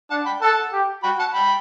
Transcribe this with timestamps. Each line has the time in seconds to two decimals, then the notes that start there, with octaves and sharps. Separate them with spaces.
0.11 D4 F#5 A5
0.26 G5 B5
0.42 A4 F#5 A5
0.73 G4
1.03 F#4 G5 B5
1.19 F#5 A5
1.34 G5 B5